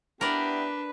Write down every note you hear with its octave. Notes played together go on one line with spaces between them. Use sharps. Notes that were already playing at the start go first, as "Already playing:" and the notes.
B3 D4 E4 G4 A#4 B4 D5